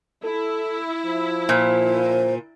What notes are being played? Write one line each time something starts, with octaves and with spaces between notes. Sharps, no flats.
E4 A4
F3
A#2 C5